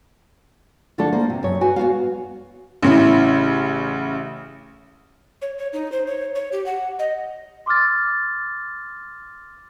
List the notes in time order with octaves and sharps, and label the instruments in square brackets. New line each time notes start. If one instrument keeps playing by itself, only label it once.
[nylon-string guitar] D3 F3 A3 D4 F4 A4
A#3 C5
C3
F#2 C#5
F#4 B4 G#5
B3 F#4 B4 F5
[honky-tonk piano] A1 C#3 E4
[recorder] C#5
C#5
D#4
C5
C#5
C#5
G4
F#5
D#5
[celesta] C6 D6 E6 F6 A6